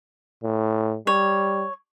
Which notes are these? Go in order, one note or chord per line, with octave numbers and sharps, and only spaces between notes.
A2
G3 C#5